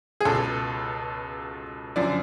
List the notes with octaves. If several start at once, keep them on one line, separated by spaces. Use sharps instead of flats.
G#4
C#2 B2 A4
F#2 D3 F3 D5